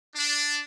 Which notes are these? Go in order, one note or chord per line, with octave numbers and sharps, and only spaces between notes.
D4